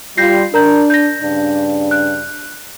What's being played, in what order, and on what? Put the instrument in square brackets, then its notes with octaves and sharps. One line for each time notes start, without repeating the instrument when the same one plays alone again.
[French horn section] G3 F4 [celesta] G6 A#6 C7
[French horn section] D4 [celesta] A#4 A#5 G6
[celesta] G6 A#6
[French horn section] G2 C#3 D4
[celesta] F#6